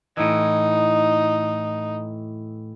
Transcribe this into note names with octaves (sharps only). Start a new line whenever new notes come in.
A2 E3 D#4